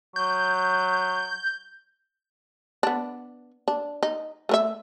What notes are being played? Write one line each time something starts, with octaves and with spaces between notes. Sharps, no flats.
F#3 G6
B3 D4
D4
D#4
A3 A#4 E5